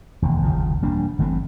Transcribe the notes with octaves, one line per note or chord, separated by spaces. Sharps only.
E1 D#2
G1 D#2 C#3 F3
E1 G3 A#3 D4
G1 E3 A3 C4